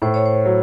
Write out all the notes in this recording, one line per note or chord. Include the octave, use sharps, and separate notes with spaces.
A2 C5
C#5
C5
F#3